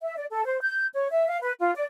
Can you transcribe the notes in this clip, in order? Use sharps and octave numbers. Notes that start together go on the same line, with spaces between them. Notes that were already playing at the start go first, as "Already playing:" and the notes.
E5
D5
A4
C5
G6
C#5
E5
F5
B4
F4
D5